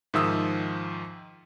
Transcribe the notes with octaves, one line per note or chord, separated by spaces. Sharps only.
G#2 D#3 F3 E5 D#6 E6